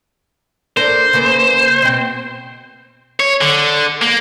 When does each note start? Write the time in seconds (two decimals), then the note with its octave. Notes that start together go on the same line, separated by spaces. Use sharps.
0.77 D4 A4 A#4 C5
1.13 C#3 A#3 B4
1.82 B2 C4
3.20 C#5
3.41 D3
4.02 A#3